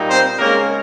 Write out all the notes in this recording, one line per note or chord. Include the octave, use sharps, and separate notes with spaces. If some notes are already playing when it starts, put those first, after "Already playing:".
Already playing: A#2 G3 A#3 D#4
C4 C5
C#3 G#3 A#3 C#4 A#4